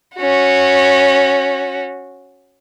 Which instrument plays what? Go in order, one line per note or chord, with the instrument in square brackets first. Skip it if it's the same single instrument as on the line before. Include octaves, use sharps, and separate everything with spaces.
[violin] C#4 F#4